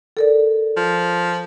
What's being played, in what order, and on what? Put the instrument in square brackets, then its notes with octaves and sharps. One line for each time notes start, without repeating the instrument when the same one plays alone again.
[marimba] A4 A#4 D5
[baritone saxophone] F3